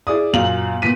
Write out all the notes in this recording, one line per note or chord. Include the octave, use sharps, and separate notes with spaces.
E4 G#4 D5 D#6
F#2 A#2 F#3 F5 F#7
A#2 B3 B6 D#7